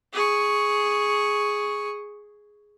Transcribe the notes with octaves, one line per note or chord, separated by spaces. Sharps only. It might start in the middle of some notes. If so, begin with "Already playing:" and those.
G#4 C#6